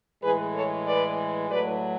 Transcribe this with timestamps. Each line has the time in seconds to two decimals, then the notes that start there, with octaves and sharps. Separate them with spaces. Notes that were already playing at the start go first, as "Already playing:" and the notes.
0.23 A2 E3 G#3 G#4 B4
0.54 A4 C#5
0.87 B4 D5
1.50 A2 F#3 A3 B4 D5